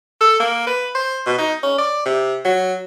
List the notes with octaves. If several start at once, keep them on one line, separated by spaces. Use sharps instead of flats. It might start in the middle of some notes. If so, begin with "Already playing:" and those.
A4
A#3
B4
C5
B2
D#4
C#4
D5
C3
F#3